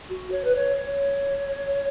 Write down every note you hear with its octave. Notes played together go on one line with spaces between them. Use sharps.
F#4
C#5
B4
C#5
C#5